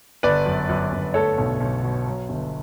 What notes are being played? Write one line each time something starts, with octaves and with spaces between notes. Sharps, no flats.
G1 B4 D5
F#2
F#2
G1
A3 A4 C#5
B1
B1
B2
F#3
G1